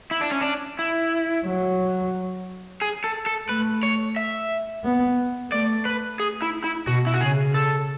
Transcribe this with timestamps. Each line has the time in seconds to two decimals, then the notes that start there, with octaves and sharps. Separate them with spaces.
0.11 E4
0.21 D4
0.31 C#4
0.41 D4
0.79 E4
1.46 F#3
2.81 G#4
3.04 A4
3.26 A4
3.49 A3 B4
3.83 C#5
4.16 E5
4.84 B3
5.51 A3 D5
5.85 B4
6.20 G#4
6.42 E4
6.64 E4
6.87 B2 F#4
7.07 E4
7.14 F#4
7.20 C#3 G#4
7.54 A4